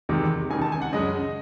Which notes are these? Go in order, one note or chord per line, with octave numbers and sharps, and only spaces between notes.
E2 C3 D#3 G#3
C#2 C3 D#3 G#5
A5
G#5
F#5
F#2 C#3 G#3 D#5